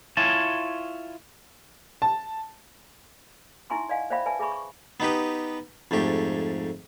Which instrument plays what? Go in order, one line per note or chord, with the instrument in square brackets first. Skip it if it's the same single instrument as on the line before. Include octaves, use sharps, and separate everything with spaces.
[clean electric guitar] E4 F4 C#5 G#5 A5
[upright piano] A5
[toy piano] D#4 E4 E5 G#5 C6 C#6
D5 D#5 F5 F#5 G#5
C5 D5 E5 F5 G5 B5
B4 D5 E5 G#5 A5
G#4 E5 G#5 B5 C#6
C#6
[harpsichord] B3 D#4 G4 B4
F2 G#2 A3 G4